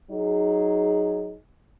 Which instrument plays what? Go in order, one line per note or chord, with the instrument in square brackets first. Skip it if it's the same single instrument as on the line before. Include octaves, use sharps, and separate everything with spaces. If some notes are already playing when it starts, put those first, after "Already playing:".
[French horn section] F#3 D#4 G#4